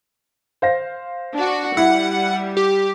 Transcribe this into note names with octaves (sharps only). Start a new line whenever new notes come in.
C5 F5 A#6
D4 F#4
G3 E4 F#5
G4